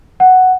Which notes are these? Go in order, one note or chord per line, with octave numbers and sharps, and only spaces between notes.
F#5